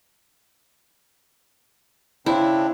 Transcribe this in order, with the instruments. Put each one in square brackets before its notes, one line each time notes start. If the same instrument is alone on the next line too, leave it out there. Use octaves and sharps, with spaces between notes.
[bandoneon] C#3 C4 D4 [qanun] E4